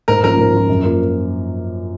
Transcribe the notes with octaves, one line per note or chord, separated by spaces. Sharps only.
G#2 A#4
F3 A#3 C#4 F4 A#4
G#2
F3 A#3 C#4 F4
F#2
F3 A#3 F4 A#4